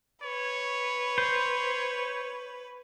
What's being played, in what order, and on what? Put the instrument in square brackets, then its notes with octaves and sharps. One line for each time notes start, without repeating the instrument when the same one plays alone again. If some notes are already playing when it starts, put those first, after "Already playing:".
[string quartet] B4 [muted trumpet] C#5
[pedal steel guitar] C5